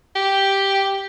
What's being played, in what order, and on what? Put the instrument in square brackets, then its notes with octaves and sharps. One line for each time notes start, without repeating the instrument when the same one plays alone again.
[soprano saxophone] G4